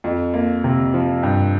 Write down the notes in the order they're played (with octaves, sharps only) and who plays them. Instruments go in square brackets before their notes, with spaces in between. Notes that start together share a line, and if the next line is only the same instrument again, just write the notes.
[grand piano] F2
A#3
C3
F3
G2